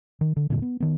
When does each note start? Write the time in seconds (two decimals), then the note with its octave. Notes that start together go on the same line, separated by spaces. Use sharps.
0.21 D#3
0.36 D3
0.50 D#1 G2 A#2 D3
0.62 B3
0.80 D#3 B3